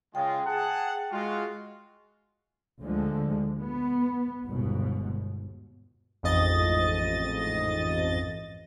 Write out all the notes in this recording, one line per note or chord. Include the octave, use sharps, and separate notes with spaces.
C#3 G#3 F4 G5
G#4 F#5 A5
G#3 F4 F#4
D2 D3 F3 G#3
B3
G1 D#2 G#2 B2
A1 F2 G#2 D#5 A6